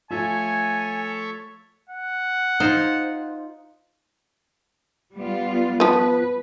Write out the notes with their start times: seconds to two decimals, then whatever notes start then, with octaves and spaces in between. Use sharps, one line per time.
0.10 F3 A3 F4 A4 C#5 E5 G#5
1.89 F#5
2.60 D#4 F4 C5
5.14 G3 B3 F4
5.80 F3 B3 B4